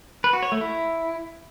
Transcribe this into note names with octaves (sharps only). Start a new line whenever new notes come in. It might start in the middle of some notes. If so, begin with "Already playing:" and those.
B4
F#4
C#5
A3
E4